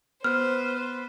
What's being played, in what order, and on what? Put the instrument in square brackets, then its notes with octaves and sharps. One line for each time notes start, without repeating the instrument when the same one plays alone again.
[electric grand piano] B3 [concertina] B4 [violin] C5 [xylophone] F6 F#6